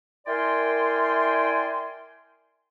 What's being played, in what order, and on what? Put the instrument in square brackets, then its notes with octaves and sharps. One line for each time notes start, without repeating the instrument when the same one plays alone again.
[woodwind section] E4 A#4 D5 G5 G#5 C6